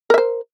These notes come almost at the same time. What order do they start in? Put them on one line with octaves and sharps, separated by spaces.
A#4 E5 C5